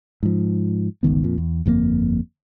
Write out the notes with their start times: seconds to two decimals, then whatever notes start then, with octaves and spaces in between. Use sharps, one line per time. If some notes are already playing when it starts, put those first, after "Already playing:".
0.23 G#2 F3
1.03 G1 C#2 D#3 B3
1.24 F2 A#2
1.38 E2
1.66 G1 F2 D3 A#3